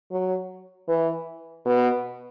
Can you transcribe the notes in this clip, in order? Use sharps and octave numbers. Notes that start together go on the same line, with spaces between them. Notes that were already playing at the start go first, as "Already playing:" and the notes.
F#3
E3
B2